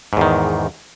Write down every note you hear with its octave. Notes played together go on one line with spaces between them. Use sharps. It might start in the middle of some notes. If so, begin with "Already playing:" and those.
E2 G#2 D#3